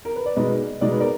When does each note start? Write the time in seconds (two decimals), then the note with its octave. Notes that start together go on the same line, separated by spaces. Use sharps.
0.05 A#4
0.16 B4
0.26 D5
0.36 B2 G#3 D#4 B4 D#5
0.81 B2 G#3 D#4 D5
0.91 B4
1.00 A#4 D5